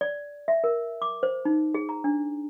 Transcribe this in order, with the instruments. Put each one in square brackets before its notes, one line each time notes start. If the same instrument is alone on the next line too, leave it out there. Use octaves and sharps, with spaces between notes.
[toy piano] D5
E5
A#4
D6
C5
D#4
G#4
A#5
D4